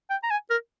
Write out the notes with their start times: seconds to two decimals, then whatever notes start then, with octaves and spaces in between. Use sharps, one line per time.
0.10 G5
0.23 A#5
0.30 G#5
0.50 A#4